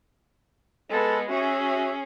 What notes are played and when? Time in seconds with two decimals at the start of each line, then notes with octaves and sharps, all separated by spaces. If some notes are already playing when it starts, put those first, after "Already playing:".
0.90 G#3 B3 A4
1.29 C#4 F#4 G#4 E5